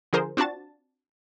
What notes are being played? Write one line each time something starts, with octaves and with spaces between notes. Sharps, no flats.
D3 F3 G#4 A#4 C5
C4 D4 F4 F#4 A5 A6